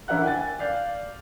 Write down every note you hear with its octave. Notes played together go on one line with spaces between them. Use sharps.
D3 E3 E4 A#4 F#5 F#6
G5 G#5 A6
D5 F5 G6